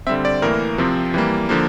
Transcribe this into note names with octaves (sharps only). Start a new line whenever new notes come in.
D3 G3 C4 E5
D5
A2 E3 A#3 A#4
C3 F3 C4
E3 G3 A#3
D3 F3 A#3